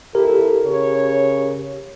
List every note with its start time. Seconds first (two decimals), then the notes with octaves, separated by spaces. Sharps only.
0.15 F2 E4 G4 A4 A#4
0.66 C#3 C#5